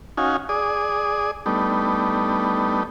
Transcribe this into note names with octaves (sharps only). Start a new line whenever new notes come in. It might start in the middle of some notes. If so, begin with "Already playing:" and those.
C#4 D#4 F#4 F5 G#5
G#4 D5 D#6
G3 A3 B3 D4 D#4